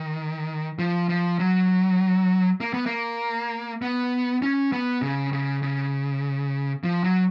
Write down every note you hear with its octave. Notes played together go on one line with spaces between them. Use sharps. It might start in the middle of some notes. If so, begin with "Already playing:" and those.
Already playing: D#3
F3
F3
F#3
A#3
B3
A#3
B3
C#4
B3
C#3
C#3
C#3
F3
F#3